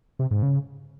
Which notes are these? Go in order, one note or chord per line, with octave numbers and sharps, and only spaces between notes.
C3
G#2
C#3